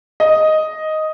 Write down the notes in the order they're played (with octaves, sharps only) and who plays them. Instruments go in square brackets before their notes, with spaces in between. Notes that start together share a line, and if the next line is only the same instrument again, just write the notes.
[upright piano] D#5